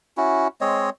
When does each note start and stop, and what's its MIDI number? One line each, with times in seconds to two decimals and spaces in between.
0.17 0.48 61
0.17 0.48 64
0.17 0.48 66
0.61 0.90 56
0.61 0.90 60
0.61 0.90 73
0.61 0.90 75